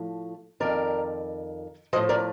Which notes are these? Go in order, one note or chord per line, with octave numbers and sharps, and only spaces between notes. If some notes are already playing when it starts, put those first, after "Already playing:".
Already playing: A2 F3
F2 D#3 A#4 D5
A2 F3 C5 D#5
A#4 D5